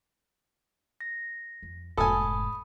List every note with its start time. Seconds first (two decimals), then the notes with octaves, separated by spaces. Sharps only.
1.01 A#6
1.63 F2
1.97 F1 G#2 A4 G#5 B5 D#6